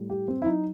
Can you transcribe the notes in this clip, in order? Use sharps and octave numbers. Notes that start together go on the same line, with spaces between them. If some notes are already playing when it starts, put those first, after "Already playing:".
Already playing: A2 G3
G4
C4
E4
F#3 D#4